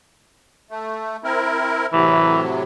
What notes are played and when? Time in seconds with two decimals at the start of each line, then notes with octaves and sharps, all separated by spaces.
0.71 A3
1.24 C4 E4 A#4
1.93 A2 C3 E3 F#3